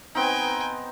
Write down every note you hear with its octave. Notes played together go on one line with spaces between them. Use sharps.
B3 C4 D#4 G5 G#5